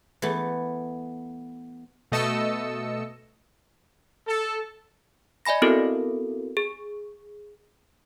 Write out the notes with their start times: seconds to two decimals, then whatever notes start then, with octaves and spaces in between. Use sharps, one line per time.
0.22 E3 A3 B3
2.12 B2 A3 D#5 A5 E6 C#7
4.27 A4
5.45 D5 D#5 G#5 B5 A#6
5.62 B3 C4 E4 F#4 A4 A#4
6.57 G#4